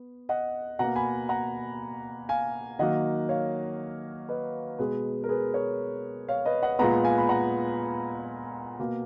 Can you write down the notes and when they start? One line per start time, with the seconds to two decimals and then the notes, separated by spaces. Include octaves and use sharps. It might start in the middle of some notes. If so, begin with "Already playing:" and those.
Already playing: B3
0.29 D#5 F#5
0.79 B2 A#3 F#5 A#5
0.96 G#5 B5
1.29 F#5 A#5
2.29 F5 G#5
2.79 D#3 F#3 A#3 D#5 F#5
3.29 C#5 F5
4.29 B4 D#5
4.79 B2 G#3 B3 G#4 B4
5.24 A#4
5.29 G#4 B4
5.54 A#4 C#5
6.29 C#5 F5
6.45 B4 D#5
6.63 D#5 F#5
6.79 A#2 G#3 B3 F#5 A#5
7.04 F5 G#5
7.18 B5
7.29 F#5 A#5
8.79 B2 A#3